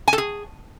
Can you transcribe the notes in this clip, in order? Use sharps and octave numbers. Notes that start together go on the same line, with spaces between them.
G#5
A4
G#4